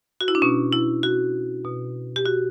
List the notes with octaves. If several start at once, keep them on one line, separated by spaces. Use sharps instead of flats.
F#4
E4
D4
B2 C#4
E4
F#4
B2
G4
F#4